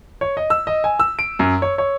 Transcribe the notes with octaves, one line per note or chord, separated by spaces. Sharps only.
C#5
D#5
E6
D#5
G#5
E6
D7
F#2
C#5
C#5